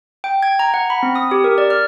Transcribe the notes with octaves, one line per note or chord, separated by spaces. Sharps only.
G5
G#6
A#5
F#5
B5
C4
D#6
G4
A#4
D5
F6